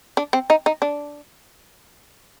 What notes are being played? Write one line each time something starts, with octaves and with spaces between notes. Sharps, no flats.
D4
C4
D#4
D#4
D4